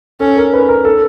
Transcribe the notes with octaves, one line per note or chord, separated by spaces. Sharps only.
C#4 A4
A#4
B4
A#4
A4